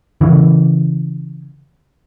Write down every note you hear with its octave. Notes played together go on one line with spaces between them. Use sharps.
C#3 E3